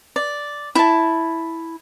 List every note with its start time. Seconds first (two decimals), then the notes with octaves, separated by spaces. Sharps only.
0.16 D5
0.75 E4 A5